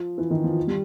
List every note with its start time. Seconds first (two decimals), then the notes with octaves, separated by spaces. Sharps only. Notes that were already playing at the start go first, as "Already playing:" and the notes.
Already playing: F3
0.18 E3
0.30 D#3
0.44 F3
0.67 G3